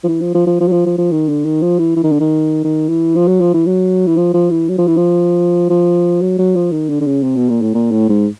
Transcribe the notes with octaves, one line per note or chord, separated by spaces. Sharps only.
F3
E3
F3
F3
F3
F3
F#3
F3
F3
F3
D#3
D3
D#3
F3
E3
E3
D#3
D3
D#3
D#3
E3
F3
F#3
F3
E3
F#3
E3
F3
F3
E3
F#3
F3
E3
F3
F3
F#3
F#3
F3
D#3
D3
D3
C#3
C3
B2
A#2
A2
A#2
A2
G#2